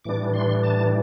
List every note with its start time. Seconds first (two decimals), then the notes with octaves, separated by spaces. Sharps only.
0.04 A2 E3 G3 D4 D6
0.34 C6
0.63 A5